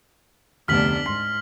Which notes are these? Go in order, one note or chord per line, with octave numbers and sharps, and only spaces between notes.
F1 D2 B3 D4 F6 B6 F#7
G#2 C6 B6